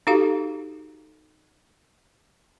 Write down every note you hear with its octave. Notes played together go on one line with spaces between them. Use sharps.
D#4 F#4 G4 A4 F5